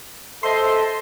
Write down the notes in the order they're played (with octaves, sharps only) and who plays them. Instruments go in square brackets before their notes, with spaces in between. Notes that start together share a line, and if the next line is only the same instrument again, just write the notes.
[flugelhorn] A4 [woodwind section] C5 D#5 E5 [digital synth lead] C6